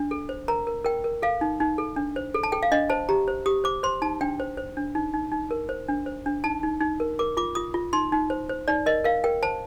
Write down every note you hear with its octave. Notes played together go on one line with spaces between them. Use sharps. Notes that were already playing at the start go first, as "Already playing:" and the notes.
Already playing: D4
A4
C5
A#4 A#5
A#4
A#4 G5
A#4
A4 F5
D#4
D#4
A4
D4
C5
A4
A5
A4 G5
F5
D4 D#5
C5 A5
G4 A#5
C5
G4 D#6
C5 D6
C5 C6
D#4 A5
D4 G5
C5
C5
D4
D#4
D#4
D#4
A#4
C5
D4
C5
D4
D#4 A5
D#4
D#4
A#4
A#4 D6
F4 D6
F4 D#6
F4
D#4 C6
D#4
C5
C5
D#4 D5
A#4 D#5
A#4 F5
A#4 G5
C5 A5